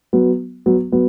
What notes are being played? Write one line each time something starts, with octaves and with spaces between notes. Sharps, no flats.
F#3 B3
F#3 B3
F#3 B3